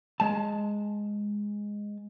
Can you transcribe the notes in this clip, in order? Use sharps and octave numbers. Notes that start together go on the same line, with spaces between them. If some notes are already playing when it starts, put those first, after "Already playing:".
G#3 A5